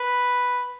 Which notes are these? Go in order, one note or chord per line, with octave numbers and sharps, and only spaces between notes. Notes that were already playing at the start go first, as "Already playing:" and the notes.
Already playing: B4